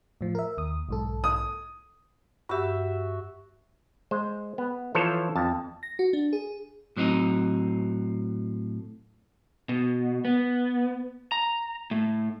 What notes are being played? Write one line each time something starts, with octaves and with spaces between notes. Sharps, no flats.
A2 F3
A#4 E5
D#2 D#6
B1 G#2 A4
D#6
G2 F#4 G4 E5
G#3 C5
B3
E3 F3 A4 C5 C#5
F2 A5
A#6
F#4
D4
G#4
A2 F#3 C4 D#4
B2
B3
A#5
A2